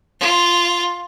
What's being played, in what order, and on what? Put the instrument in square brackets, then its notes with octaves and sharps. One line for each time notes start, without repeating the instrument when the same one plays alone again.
[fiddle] F4